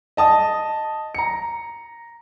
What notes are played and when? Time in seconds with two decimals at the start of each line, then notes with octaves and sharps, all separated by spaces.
0.17 D#5 A5 D#6
1.15 A#5 C#7